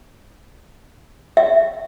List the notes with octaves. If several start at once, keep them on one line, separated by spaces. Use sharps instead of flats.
E5